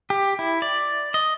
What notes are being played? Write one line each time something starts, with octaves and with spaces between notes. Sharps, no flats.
G4
E4
D5
D#5